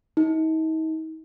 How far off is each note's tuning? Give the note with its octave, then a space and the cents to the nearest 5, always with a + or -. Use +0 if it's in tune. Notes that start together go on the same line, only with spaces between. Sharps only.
D#4 +40